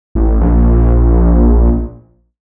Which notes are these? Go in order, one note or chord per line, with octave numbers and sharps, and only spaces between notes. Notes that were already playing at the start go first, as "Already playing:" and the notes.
A1
A#1